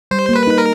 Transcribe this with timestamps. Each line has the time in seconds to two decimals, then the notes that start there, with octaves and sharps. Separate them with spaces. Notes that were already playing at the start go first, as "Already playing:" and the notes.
0.11 G3 C5
0.29 A#3
0.35 B4
0.47 D#4
0.58 A#4